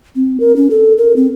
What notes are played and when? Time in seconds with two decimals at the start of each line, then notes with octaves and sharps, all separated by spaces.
0.16 C4
0.40 A#4
0.56 C#4
0.71 A4
0.98 A#4
1.16 C4